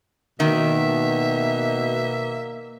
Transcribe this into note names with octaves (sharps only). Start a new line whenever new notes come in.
B2 D#3 A#3 E5